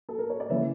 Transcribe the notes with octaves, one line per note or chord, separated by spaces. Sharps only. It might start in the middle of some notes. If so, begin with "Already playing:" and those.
A4
A#4
C#5
D5
C#3 E3 A3 C#5 E5